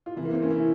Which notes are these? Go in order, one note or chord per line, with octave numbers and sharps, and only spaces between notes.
F4
C3 E3 E4
A#3
C4
C#4
E4